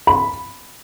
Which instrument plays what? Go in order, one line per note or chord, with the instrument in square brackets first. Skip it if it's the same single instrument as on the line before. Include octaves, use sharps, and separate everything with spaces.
[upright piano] B5